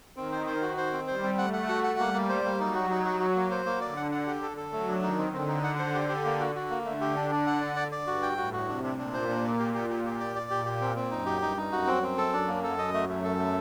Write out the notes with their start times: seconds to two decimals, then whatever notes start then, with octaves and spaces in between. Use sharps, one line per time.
0.16 D#3 C4
0.32 C5
0.47 C5
0.62 F#4
0.78 C5
0.92 C4
1.07 G3 C5
1.23 C4
1.38 A3 F#5
1.53 F#5
1.68 F#4
1.84 F#5
1.99 G3 A#3
2.14 A#3
2.29 C5
2.45 A#3
2.60 F#3 D#4
2.75 F#4
2.90 D#4
3.05 F#4
3.20 F#4
3.36 A#3
3.51 C5
3.66 A#3
3.81 D3 D5
3.97 F#5
4.12 F#5
4.27 G4
4.42 A4
4.57 A4
4.72 F#3 A3
4.88 D4
5.03 D#3 D#4
5.18 C4
5.33 D3 C4
5.49 D#4
5.63 F#5
5.79 C5
5.94 G4
6.09 G4
6.25 A#3
6.40 F#4
6.55 F#4
6.70 A#3
6.85 D3 A3
7.01 G4
7.16 D4
7.31 D4
7.47 F#5
7.61 D5
7.76 D5
7.92 D5
8.06 G2 F#4
8.22 G5
8.37 A2 F#4
8.53 F#4
8.68 C3 D4
8.84 D4
8.98 A#2 D4
9.14 C5
9.28 D4
9.44 A#3
9.59 G4
9.74 G4
9.90 G4
10.05 G4
10.20 D5
10.35 D5
10.50 A#2 G4
10.66 G4
10.81 C4
10.96 C4
11.11 F#2 D#4
11.26 G4
11.41 G2 D#4
11.57 D#4
11.72 F#2 F#4
11.87 C4
12.03 C4
12.18 A4
12.33 F#2 D4
12.48 A#3
12.64 A4
12.78 D#5
12.94 A3
13.09 A3
13.24 A4
13.39 A3